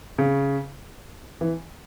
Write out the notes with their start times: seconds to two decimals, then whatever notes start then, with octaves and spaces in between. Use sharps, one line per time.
0.18 C#3
1.41 E3